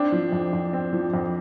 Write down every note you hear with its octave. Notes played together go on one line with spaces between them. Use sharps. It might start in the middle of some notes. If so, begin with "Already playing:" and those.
Already playing: C4 D4
F3
F2
F2
C4
F3
F2